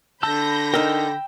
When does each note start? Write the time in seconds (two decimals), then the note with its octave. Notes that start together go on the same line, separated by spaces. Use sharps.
0.23 D3 A5 B5 E6 G6 A#6
0.74 D#4 A#4 G5 E6